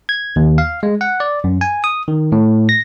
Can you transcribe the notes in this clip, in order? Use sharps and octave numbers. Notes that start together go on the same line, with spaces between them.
G#6
D#2
F5
G#3
F#5
D5
F#2
G#5
D#6
D#3
A2
A#6